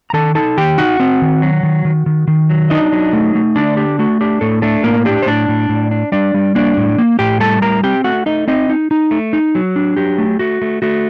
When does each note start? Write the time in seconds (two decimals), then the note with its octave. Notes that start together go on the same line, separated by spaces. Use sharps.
0.10 A#5
0.13 D#3 A4 A5
0.35 D#4 A4 A5
0.57 D#3 G4 G5
0.78 D#4 F#4 F#5
1.00 C4
1.22 D#3
1.42 F#3
1.63 D#3
1.85 D#3
2.06 D#3
2.28 D#3
2.49 F#3
2.70 D4 D#4 D#5
2.92 F#3
3.13 A3
3.35 A3
3.56 D3 D4 D5
3.77 D4 G4
3.99 A3 F#4
4.21 D4 G4
4.41 A2 A3 A4
4.62 A3 D4 A4
4.84 A2 A#3 A#4
5.05 D4 G4
5.22 C5
5.26 A2 D4 D5
5.49 A2
5.69 A2
5.91 D4
6.12 G3 D4 D5
6.34 G3
6.55 A#3 D4 D5
6.77 A2
6.98 A#3
7.19 A2 G4 G5
7.40 G3 A4 A5
7.62 A2 A#4 A#5
7.83 C4 G4 G5
8.04 A3 F#4 F#5
8.26 A3 D#4 D#5
8.48 C4 D#4 D#5
8.70 D#4
8.91 D#4
9.11 A3
9.33 D#4
9.55 F#3
9.76 D4
9.97 F#3 G4
10.18 A3
10.39 A3 F#4
10.62 A3
10.82 A3 F#4